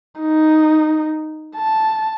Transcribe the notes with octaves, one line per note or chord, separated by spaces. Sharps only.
D#4
A5